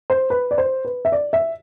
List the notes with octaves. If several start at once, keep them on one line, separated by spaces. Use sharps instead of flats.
C5
B4
D5
C5
B4
E5
D5
E5